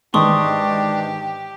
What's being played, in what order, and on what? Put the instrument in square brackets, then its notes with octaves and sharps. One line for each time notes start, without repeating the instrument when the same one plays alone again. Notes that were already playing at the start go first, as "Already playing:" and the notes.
[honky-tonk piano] G#2 D#3 E3 [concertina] D4 [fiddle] G4 [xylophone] C6 C#6 D#6